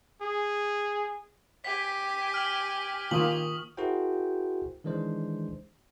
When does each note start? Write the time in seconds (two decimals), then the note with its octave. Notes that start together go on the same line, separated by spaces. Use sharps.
0.22 G#4
1.64 G4 G#5 B6
2.34 F6 F#7
3.11 D#3 A#3 F4 C#6 D#6 F#7
3.77 E4 F#4 G#4 A#4 C5 G5
4.84 D#3 E3 G#3 D4 C5